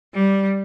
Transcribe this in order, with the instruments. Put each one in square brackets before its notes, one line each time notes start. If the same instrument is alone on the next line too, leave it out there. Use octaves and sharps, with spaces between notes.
[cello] G3